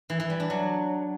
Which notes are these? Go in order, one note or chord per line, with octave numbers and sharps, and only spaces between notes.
E3
E3
G3
D4
F#3